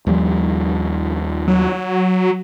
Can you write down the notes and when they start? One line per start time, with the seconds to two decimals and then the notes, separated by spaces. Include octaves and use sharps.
0.07 D#2 F3 G3
1.48 F#3